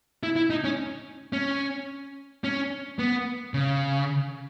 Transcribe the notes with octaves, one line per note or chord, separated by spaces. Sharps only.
E4
E4
D#4
C#4
C#4
C#4
B3
C#3